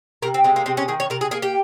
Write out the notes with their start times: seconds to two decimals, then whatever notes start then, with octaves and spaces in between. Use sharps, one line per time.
0.22 C3 A#4
0.34 C4
0.44 G#3 C4
0.56 A#3
0.66 C3 C4
0.77 C#4
0.88 D#3 G#4
1.00 C#5
1.10 C3 A#4
1.21 G#4
1.31 A#3 G#4
1.42 G4